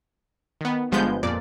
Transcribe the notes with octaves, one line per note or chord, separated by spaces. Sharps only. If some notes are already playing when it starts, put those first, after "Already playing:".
D#3 B3
G1 G2 F3 G#3 B3 G6
F2 A#2 D5